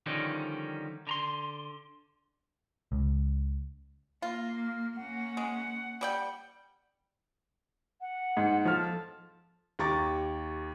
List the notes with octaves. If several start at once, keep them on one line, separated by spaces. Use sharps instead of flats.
D3 D#3 F3 G3 C#4 D#4
D3 A#5 C6
C#2
A#3 F4
F6
A#3 C#4 F#5
G#3
G3 D5 G5
F#5
G#2
F3 A4 A5 F6
D#2 G4 A#5 C#6 D6 A6